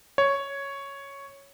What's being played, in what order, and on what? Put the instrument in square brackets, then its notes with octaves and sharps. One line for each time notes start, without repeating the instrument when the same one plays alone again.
[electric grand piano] C#5